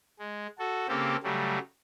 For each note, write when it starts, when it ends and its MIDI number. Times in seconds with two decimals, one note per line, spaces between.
0.19 0.47 56
0.59 0.87 66
0.59 0.87 69
0.88 1.16 49
0.88 1.16 58
0.88 1.16 60
0.88 1.16 67
0.88 1.16 69
1.23 1.58 49
1.23 1.58 54
1.23 1.58 55
1.23 1.58 57